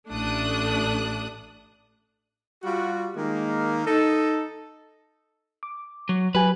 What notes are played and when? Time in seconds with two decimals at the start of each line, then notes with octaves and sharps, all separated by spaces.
0.11 A1 A3 D4 D#6 F#6
2.63 G3 F4 F#4
3.16 D#3 G#3 A#3
3.86 D#4 A4
5.63 D6
6.09 F#3
6.35 F#3 G4 B4 G#5